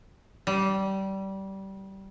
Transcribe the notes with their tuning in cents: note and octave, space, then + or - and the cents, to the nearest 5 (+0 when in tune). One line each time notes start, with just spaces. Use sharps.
G3 -20